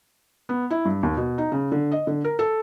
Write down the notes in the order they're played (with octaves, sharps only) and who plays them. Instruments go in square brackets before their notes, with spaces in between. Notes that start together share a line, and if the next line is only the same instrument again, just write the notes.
[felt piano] B3
E4
G2
D#2
B2
D#4
C#3
D3
D#5
D3
A#4
A4